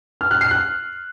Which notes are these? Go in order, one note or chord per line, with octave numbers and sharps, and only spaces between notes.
F6
F#6
C7
F#6